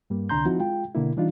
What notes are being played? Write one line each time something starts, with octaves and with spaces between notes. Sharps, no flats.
G2 G3 A#3
C2 D3 D4 A#5 C6 G6
F3 C4 D#4 E4 F#4
G#3 F4 G5
B2 D3 A#3 E4
E3 G3 D4 D#4 F4